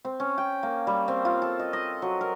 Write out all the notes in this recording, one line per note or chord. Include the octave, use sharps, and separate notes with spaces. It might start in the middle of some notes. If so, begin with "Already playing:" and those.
C4
C#4
G5
A#3
G3
C4
F4
A4
D#5
D#5
F#3
A#4